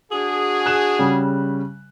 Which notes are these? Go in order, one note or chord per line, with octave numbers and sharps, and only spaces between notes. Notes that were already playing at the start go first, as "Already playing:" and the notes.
D4 F#4 G#4
F#6 E7
C#3 G3